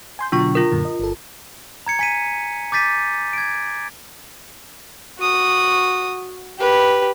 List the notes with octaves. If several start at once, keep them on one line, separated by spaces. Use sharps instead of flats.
G#5 C6 G6
B2 D3 F#3 D4 F4 C#6
F4 A#4
F#2 A#2 D3
D#5
G1 A4
A#5 G#6 C#7
G#5 B6 D#7
D6 G6 A6 B6 D#7
G#6 D7
F#4 D#6
G4 B4